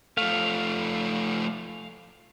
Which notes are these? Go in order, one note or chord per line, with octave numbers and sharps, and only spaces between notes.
F3 A3 F5